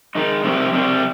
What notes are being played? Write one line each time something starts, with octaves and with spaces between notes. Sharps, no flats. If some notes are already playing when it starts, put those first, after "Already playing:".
D#3 G#3 D#4
C3 D#3 G3 C4
C3 D#3 G3 C4